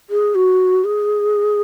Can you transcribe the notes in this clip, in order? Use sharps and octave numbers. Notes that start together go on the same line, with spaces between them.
G#4
F#4
G#4